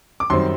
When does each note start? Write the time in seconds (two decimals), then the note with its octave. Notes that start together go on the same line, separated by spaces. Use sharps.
0.20 D6
0.30 F#2 D#3 G3 C4 C6